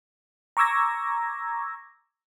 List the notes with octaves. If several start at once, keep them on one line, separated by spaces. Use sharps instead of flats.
A#5 C#6 D6 E6 G#6 A#6